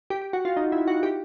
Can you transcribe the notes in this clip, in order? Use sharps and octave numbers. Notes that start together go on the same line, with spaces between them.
G4
G4
F#4
F4
D#4
E4
F#4
G4